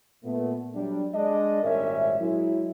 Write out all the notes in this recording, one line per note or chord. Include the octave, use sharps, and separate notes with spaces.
A#2 A3 B3
F#3 G3 D4
G#3 D4 D#5
G#1 A#2 G3 C#4 A#4 E5
F#3 G#3 E4